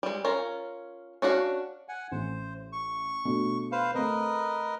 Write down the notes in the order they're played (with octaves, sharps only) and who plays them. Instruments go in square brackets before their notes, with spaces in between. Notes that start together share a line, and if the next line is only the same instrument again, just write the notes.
[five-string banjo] G3 G#3
C#4 F4 A#4
C#4 D4 F#4 F5
[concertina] F#5 G#5
[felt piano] A1 [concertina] C5
[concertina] C#6
[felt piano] B2 A3 D4
[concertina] B4 C5 F5
[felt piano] A3 C4 [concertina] A#4 B4 D#5